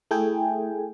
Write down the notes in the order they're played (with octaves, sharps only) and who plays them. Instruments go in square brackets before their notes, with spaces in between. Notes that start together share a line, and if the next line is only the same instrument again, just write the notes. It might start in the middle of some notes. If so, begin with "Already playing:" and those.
[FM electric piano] A3 E4 G#4 G5 G#5